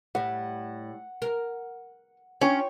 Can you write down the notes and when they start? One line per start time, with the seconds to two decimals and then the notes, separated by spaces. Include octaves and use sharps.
0.15 A2 G3 F#5
1.22 A#4
2.41 C#4 F4 C#5 G5 C#6